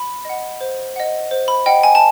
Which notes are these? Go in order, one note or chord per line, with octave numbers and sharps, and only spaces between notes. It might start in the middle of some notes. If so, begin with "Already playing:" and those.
Already playing: B5
D#5 F#5
C5
D#5 F#5
C5
B5
D#5 F#5 G5
G#5
A5